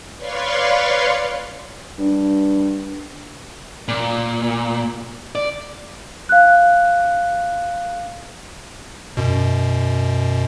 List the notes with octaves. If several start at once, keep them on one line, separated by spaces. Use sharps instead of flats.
B4 C#5 D5 F5 C6 C#6
G2
A#2
D5
F5 F#6
F#2 B2